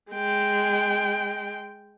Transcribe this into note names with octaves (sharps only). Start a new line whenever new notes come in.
G#3 G5